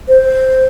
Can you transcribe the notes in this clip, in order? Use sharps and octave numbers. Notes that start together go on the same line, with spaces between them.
C5